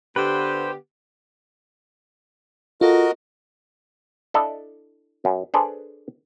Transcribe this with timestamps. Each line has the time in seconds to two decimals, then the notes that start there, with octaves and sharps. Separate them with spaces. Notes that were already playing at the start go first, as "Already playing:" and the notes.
0.16 D3 B3 G4 B4 C5
2.81 F4 F#4 A4 A#4 D#5
4.34 D4 E4 A4 D5 D#5
5.25 F#2
5.54 D4 G#4 A4 B4 C5 D5